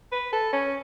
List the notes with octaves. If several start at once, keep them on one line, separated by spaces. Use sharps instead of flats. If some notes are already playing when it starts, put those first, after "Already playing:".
B4
A4
C#4